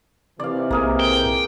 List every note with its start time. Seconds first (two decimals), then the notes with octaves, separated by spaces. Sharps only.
0.40 C3 D#3 E3 D5 F5
0.71 B1 A#3 G#4 A#4
1.00 G5